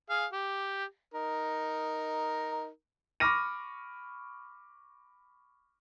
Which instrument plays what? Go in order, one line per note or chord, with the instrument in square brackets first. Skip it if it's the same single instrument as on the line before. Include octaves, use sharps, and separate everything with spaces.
[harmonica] G#4 F5
G4
D#4 A#4
[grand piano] B5 C#6 D6 F6 A#6 D#7